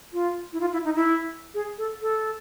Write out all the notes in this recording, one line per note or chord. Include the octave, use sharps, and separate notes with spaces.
F4
E4
F4
E4
D#4
E4
G#4
A4
A4